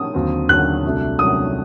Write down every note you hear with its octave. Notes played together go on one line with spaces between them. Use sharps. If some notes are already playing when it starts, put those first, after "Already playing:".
Already playing: D#6
D#2 D3 F#3 C4
D#2 D3 F#3 C4 F#6
C2 C3 F#3 A3 D4
C2 C3 F#3 A3 D4 D#6